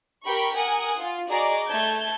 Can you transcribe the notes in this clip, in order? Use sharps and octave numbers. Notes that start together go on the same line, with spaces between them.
G4 A#4 G5 B5 C#6
A#4 F#5 G#5 D#6
F4
F#4 G#4 D5 D#5 A#5 D6
A3 A5 G6 G#6